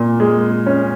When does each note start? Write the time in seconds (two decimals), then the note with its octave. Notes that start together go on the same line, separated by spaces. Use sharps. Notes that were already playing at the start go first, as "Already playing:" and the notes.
Already playing: A#2
0.20 G#3
0.66 C#4